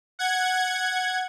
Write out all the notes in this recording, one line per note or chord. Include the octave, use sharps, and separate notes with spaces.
F#5 G#6